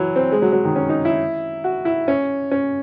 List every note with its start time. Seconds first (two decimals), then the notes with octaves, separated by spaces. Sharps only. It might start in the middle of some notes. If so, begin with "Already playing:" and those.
Already playing: E3 F#3
0.16 C4
0.32 G#3
0.42 F#3
0.53 F#3
0.65 D#3
0.76 C#4
0.89 D#4
1.05 E4
1.64 F#4
1.85 E4
2.08 C#4
2.51 C#4